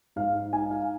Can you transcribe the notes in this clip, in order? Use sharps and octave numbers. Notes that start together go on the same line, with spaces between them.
G#2 F5
D#4 G#5
F5